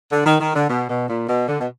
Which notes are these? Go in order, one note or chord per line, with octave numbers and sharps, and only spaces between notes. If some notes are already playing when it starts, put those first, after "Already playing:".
D3
D#3
D#3
D3
B2
B2
A#2
B2
D3
B2